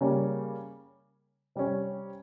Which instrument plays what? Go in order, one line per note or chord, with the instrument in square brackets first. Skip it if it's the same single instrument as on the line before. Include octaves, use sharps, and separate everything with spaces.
[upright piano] C#3 G3 A#3 C#4
C3 G3 C#4